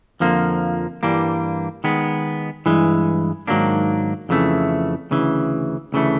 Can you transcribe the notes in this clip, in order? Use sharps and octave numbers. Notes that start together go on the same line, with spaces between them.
F2 D3 F3 A#3
G2 E3 G3 A#3 D4
D#3 G#3 B3
G2 E3 G#3
G#2 D#3 F#3 A#3 D4
F2 C#3 E3 A3
D2 C#3 E3
D2 C#3 E3 A3